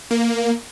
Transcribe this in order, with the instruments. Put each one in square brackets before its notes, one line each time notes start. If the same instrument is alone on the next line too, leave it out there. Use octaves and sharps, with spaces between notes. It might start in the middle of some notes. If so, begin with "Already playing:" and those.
[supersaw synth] A#3